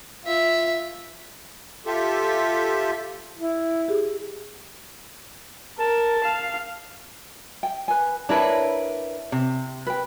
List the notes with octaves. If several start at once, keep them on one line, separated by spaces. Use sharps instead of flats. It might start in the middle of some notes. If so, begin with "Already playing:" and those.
F4 E5
F4 G4 A4 E5
E4
G4 G#4
A#4 A5
F5
G5
B4 G#5
D4 E4 A#4 B4 C#5 A5
C3
B4 G5